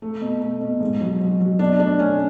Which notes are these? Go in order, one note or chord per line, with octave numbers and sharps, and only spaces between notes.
A3
B2
A3
B2
G#2
F#3
F#3
F#3
B2 D4
A3 D4
A3 C#4